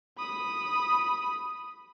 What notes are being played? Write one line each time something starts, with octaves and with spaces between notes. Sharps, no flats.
B5 D#6